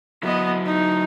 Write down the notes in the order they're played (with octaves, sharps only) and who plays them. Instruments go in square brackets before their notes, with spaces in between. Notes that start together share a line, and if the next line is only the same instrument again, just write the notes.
[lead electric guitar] F#3 E4 [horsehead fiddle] B3 D#5
[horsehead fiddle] D#4